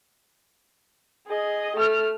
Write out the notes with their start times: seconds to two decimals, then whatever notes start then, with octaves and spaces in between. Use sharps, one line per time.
1.27 G#4 D#5
1.76 A3 F6